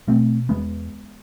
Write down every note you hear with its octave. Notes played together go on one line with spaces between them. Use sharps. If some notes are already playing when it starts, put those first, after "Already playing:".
B2 A3 C4
E2 G#3 B3